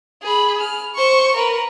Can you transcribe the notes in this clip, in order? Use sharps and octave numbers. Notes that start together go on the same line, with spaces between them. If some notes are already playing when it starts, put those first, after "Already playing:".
G#4 B5
F6
C5 C#6
A#4 B4